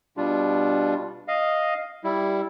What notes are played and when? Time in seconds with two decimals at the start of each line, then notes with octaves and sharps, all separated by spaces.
0.17 B2 G3 D4 F4
1.28 D#5 F5
2.04 G3 E4